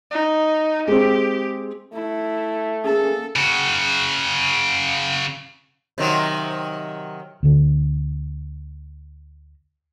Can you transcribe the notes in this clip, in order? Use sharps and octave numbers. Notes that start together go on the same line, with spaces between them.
D#4
G#3 C4 G4
A3 E4
A#3 C#4 G#4 A4
C#3 F#4
C3 D#3 F#3
D2 D3